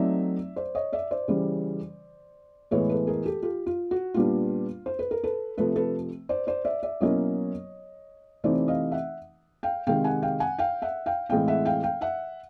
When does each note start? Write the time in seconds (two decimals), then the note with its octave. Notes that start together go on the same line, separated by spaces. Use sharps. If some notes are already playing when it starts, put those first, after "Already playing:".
Already playing: F#3 A3 C4 D#4 D5 E5
0.56 C5 D5
0.75 C#5 D#5
0.93 D5 E5
1.11 C5 D5
1.28 C#3 E3 G3
2.71 A2 E3 G#3 B3 B4 C#5
2.89 A4 B4
3.07 G#4 A#4
3.26 G4 A4
3.43 F4 G4
3.66 F4
3.91 F#4
4.14 A#2 G3 B3 D4 F4
4.86 C5
4.99 B4
5.11 A#4
5.23 A4 B4
5.58 C3 F3 A3 A4 B4
5.76 A4 B4
6.29 C5 D5
6.47 C5 D5
6.65 D5 E5
6.83 D5 E5
7.00 B2 F#3 A#3 C#4 E4 C#5 D#5
8.44 C3 E3 A3 C4 D#4 C5 D5
8.68 D#5 F5
8.92 E5 F#5
9.63 F5 G5
9.87 C3 D#3 G#3 F5 G5
10.04 F#5 G#5
10.23 F5 G5
10.40 F#5 G#5
10.59 F5 G5
10.82 E5 F#5
11.06 F5 G5
11.30 A2 E3 G#3 C4 F5 G5
11.48 E5 F#5
11.66 F5 G5
11.83 F5 G5
12.01 E5 F#5